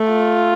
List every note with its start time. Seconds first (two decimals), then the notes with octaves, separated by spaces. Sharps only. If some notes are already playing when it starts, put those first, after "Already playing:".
Already playing: A3
0.10 F4